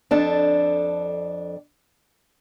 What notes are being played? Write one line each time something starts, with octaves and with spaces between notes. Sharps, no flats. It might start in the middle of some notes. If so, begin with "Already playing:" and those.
F2 D4 A4